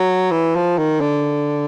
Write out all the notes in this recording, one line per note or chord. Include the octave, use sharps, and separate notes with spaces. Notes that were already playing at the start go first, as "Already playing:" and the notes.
Already playing: F#3
E3
F3
D#3
D3